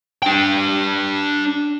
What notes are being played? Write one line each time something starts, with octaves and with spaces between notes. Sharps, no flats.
D4 G5